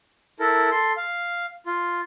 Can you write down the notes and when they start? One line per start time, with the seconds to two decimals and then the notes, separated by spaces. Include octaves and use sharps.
0.40 E4 A4 A#4
0.71 A4 C6
0.97 F5
1.66 F4